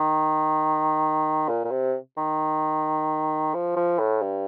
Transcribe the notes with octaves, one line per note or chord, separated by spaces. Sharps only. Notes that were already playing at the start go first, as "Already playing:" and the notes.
Already playing: D#3
A#2
A#2
C3
D#3
F3
F3
A2
G2